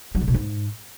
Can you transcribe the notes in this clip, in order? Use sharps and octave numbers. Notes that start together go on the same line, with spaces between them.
F#3
C3
B2
G#2